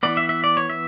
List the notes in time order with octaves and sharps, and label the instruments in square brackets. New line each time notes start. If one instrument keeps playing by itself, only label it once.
[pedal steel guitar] E3 B3 D5
E5
E5
D5
C#5
E5